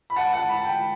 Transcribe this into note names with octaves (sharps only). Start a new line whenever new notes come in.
B5
F#5 A5
F#5 A5
B5
A5
G5 B5